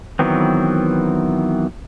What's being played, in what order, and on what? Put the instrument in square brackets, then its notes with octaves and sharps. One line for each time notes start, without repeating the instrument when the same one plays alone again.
[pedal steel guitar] D#3 E3 F#3 B3 C4